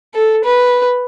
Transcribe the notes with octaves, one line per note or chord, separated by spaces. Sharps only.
A4
B4